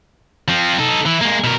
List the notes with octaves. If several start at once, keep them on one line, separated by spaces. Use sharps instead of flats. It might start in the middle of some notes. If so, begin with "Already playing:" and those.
F3 C4
D#4 A4
E3 E4
G#3 A#3
B2 A#4